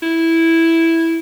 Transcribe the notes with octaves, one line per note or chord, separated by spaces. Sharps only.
E4